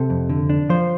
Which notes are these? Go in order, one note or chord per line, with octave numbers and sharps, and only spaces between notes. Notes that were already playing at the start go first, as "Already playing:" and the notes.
Already playing: C3 A4
F2
D3
D4
F3 C5